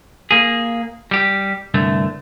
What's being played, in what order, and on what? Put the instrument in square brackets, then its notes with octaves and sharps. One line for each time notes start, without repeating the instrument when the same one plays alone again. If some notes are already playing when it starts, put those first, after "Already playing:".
[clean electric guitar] A#3 G#4
G3 G4
C2 G2 D3 A3